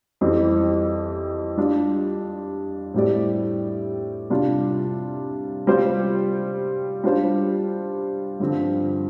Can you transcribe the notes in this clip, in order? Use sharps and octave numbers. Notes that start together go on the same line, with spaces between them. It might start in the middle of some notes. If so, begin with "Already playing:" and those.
F2 E3 G3 C4
G3 D4 F4
A2 G3 C4 G4 D5
C3 G3 D4 F4
G3 C4 F4 C5
G3 D4 F4 C5
G2 D3 F3 C4